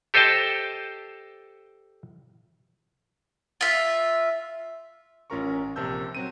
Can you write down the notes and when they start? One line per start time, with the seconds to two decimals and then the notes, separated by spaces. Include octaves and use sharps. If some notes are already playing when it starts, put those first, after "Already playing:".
0.14 G4 A4 C5 D#5 G5 A5
3.61 F4 E5
5.30 A1 C#4 F4 A#4 A#5 C#6
5.76 A#1 C3 A#4 A5 E6 G6
6.15 F#3 C4 D#7